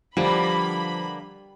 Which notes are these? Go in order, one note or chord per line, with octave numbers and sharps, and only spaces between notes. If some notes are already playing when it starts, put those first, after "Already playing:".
D3 F3 G3 A#3 B3 B5